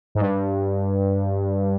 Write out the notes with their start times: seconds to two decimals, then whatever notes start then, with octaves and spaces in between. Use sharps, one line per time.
0.15 G#2
0.21 G2